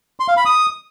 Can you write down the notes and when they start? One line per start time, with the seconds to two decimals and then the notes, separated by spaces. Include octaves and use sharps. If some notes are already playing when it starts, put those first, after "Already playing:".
0.20 C6
0.28 F5
0.37 B5
0.46 D#6